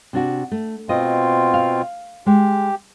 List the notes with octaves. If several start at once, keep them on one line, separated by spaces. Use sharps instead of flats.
C3 D4 F#4
A3
B2 C4 F4 D#5
F5
G#3 G4